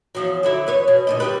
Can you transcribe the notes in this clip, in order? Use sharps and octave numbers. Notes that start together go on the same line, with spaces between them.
E2 F3 F#3
D3 F#3 E4
E2 B4 C#5
B2
D2 A#2 D#5
G3 G4 B4